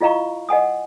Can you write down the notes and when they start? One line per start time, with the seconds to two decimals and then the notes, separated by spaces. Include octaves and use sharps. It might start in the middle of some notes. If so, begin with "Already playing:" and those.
0.01 E4 F4 D#5 F5 A#5 C#6
0.49 D#5 F#5 G#5 D#6